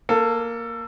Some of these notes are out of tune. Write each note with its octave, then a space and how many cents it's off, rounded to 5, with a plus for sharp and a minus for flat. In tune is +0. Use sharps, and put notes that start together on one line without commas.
A#3 +0 A4 +20